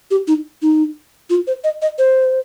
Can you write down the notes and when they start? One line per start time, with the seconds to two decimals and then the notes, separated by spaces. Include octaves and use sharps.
0.11 G4
0.28 D#4
0.62 D#4
1.30 F4
1.47 C5
1.64 D#5
1.82 D#5
1.98 C5